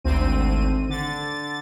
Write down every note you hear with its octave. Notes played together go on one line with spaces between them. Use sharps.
G#1 D2 C4 D#7
D3 A6